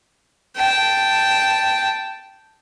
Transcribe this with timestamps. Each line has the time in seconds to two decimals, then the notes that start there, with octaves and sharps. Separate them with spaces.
0.56 G5 A5